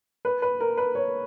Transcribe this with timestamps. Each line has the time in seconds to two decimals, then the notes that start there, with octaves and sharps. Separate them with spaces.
0.25 B4
0.42 B4
0.60 A#4
0.77 B4
0.95 C#5